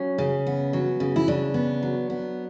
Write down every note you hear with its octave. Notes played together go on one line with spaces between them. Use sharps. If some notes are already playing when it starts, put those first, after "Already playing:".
Already playing: F#3 C#4
C#3
B3
F#3
C#3
E4
C#3 D4
B3
F#3
B3